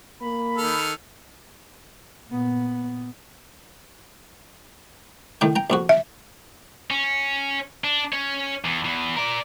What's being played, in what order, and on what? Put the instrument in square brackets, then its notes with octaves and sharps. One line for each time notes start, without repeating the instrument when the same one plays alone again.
[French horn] A#3 [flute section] B5
[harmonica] D#3 A4 F6
[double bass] A#2 B3
[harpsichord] A2 D#3 G5
G5 A#5
A#1 F2 F#4
[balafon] E5
[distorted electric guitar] C#4
D4
C#4 C#5
E2
E2 E3
A#4 D5